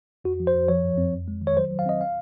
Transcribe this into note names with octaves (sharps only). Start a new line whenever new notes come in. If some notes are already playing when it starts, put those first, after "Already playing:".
F2 F#4
F3
C5
F2
F3 C#5
F#2
C4
F2
G#3
D#3
C#5
F#3 C5
F#3
F5
C4 D#5
F5